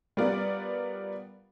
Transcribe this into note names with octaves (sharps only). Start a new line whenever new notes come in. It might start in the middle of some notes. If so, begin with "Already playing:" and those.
G3 B3 F4 A#4 D5 F#5